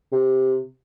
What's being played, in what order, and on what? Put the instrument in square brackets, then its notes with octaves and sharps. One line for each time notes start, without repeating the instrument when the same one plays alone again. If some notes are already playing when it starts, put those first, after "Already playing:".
[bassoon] C3